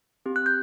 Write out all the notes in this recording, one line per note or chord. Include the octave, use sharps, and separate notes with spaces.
C4 G4
F#6
G6